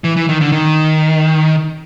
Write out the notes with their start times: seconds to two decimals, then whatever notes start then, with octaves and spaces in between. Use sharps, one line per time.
0.04 E3
0.17 E3
0.29 D#3
0.41 D3
0.52 D#3